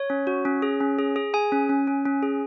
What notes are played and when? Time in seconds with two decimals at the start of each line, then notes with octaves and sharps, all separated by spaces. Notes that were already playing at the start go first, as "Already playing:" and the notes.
Already playing: C#5
0.10 C#4
0.27 F#4
0.45 C#4
0.62 G#4
0.80 C#4
0.99 G#4
1.16 G#4
1.34 G#4 G#5
1.52 C#4
1.69 C#4
1.87 C#4
2.05 C#4
2.23 G#4